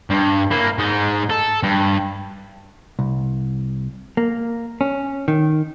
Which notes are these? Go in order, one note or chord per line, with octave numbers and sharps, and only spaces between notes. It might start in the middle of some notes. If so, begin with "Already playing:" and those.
G2
A#3 E4
G#2 D#4
A4
G2
C2
A#3
C#4
D#3